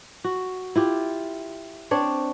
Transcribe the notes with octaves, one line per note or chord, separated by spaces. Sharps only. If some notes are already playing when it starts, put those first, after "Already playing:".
F#4
E4 F4 G4
C4 D4 C#5